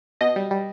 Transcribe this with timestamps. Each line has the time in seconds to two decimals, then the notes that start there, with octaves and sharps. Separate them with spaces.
0.21 B2 D#5
0.36 G3
0.51 G3